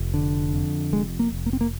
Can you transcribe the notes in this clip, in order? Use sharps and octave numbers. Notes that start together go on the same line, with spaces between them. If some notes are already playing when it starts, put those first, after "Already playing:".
Already playing: F1
D3
F2
F1 G#3
A#3
F1
A#3
C4
A#3